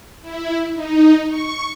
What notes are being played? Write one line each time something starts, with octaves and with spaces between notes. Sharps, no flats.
E4
D#4
C#6